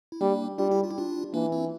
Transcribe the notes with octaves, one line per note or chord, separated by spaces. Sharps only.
E4
G3 A#3 D4
G3 D4 F4
E4 G4
F4
E4
D4 F4
E3 A#3 D4
C4 E4